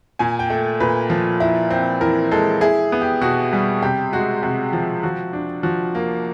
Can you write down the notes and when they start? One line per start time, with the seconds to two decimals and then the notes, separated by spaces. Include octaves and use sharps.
0.19 A#2 G#5
0.39 G5
0.50 A3
0.80 A#2 B4
1.10 F3
1.40 E4
1.70 C4
2.01 E3 A#4
2.31 G#3 A4
2.61 E4 G#4
2.92 B3
3.01 G4
3.21 B2 F#4
3.53 G3
3.82 C3 G4
4.13 G#3 F#4
4.43 C3 F#4
4.73 F3
5.03 F3 F#4
5.33 D4
5.63 F3 F#4
5.95 A#3